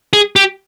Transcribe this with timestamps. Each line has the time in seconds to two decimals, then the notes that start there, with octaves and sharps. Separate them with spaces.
0.13 G#4
0.36 G4